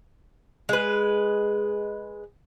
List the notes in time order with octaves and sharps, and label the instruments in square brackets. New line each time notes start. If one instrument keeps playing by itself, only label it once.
[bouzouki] G#3 B4